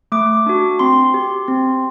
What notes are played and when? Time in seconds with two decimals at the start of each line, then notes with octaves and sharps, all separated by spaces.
0.12 A3 D6
0.46 D4 F#4
0.79 C4 C6
1.14 G4
1.48 C4